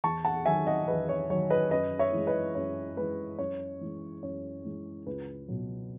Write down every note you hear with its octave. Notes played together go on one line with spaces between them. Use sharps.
E2 A5 C#6
F#5 A5
D#3 F#3 E5 G#5
D#5 F#5
E2 B4 D#5
C#5
D#3 F#3 C#5
B4 D#5
F#2 B4 D#5
C#5 E5
E3 G#3
B4 D#5
F#2 C#5
E3 G#3 B4
F#2 C#5
E3 G#3
F#2 C#5
E3 G#3
C#2 B4
B2 F#3